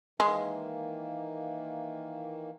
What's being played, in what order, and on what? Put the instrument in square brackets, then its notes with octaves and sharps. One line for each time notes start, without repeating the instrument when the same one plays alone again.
[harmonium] D#3 E3 A#3 [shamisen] G#3